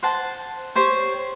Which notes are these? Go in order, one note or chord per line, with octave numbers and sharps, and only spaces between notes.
C5 F#5 A5
G4 C5 C#5